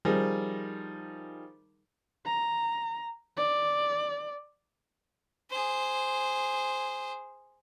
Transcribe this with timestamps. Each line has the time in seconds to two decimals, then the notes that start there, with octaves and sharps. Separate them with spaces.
0.05 D#3 F3 G3 D#4 G#4 A#4
2.25 A#5
3.37 D5
5.51 G#4 C5